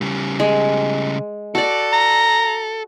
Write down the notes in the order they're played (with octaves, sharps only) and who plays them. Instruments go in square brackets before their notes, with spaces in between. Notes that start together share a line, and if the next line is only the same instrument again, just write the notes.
[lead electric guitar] C#3 G3
[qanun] G#3
[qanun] F#4 D5 [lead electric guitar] A4
[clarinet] A#5